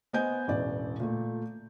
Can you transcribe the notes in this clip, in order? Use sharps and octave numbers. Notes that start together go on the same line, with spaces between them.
B3 C5 D#5 G#5 G6
E1 A1 D5
A#2 A3